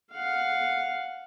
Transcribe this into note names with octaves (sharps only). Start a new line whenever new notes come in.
F5 F#5